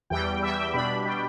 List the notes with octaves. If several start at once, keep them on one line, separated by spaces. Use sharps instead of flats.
E2 E3 G3 G5
E2 E3 G3 E5
G5
B2 G3 D4 B5
B2 G3 D4 G5